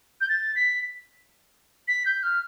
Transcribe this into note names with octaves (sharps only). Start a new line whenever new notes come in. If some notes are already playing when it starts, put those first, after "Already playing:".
G6
A6
B6
B6
G6
F6